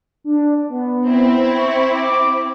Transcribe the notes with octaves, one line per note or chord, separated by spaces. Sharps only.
D4
B3
C4 E4
C#6
D6